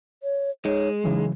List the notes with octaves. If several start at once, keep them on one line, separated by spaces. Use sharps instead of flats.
C#5
G#3 D#4 C#5
C#3 E3 F#3 D#4